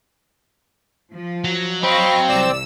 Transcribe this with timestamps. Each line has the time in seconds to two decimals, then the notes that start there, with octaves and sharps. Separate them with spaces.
1.14 F3
1.44 F#3
1.83 C4 D#5 F5 B5 C#6
2.28 C2 D5 E6